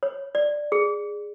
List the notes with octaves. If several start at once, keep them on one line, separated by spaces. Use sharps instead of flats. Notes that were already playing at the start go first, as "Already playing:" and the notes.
C#5
D5
G#4